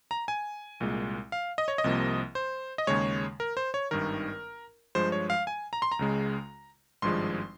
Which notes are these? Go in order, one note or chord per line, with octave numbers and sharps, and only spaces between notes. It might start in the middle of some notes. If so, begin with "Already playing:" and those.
A#5
G#5
C2 A#2 G#3
F5
D#5
C#5
D#5
C2 C3 F3 A#3
C5
D#5
D#2 C#3 G#3 C#5
A#4
C5
C#5
G#1 G2 D#3 A#4
G2 F3 G#3 C5
C#5
F5
G#5
A#5
C6
A#5
C#2 C#3 G#3
G#1 G2 F3 G#3 C6